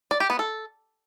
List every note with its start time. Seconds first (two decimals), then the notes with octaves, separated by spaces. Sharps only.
0.11 D5
0.20 G4
0.30 B3
0.39 A4